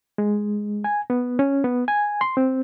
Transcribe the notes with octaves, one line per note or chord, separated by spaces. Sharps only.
G#3
G#5
B3
C#4
B3
G#5
C6
C4